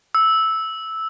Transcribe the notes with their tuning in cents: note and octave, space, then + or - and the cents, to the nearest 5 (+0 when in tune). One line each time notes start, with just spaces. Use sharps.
E6 -10